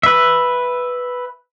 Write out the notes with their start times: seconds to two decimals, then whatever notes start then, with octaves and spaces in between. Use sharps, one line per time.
0.03 B4 E5